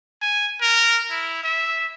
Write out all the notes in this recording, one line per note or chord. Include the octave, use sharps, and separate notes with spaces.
G#5
A#4
E4
E5